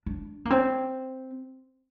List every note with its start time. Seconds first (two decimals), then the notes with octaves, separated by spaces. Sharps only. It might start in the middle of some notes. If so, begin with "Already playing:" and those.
0.06 D4
0.45 A#3
0.50 C4